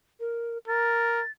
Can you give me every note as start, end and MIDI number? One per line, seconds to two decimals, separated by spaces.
0.20 0.58 70
0.68 1.21 70
0.68 1.31 93